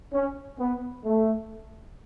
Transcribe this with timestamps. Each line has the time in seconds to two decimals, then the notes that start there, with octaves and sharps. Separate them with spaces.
0.13 C#4
0.59 B3
1.04 A3